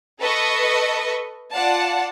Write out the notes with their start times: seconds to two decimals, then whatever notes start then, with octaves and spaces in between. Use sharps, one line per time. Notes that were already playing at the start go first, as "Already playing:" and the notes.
0.22 A4 B4 D#5 C#6
1.52 F4 D5 F#5 A5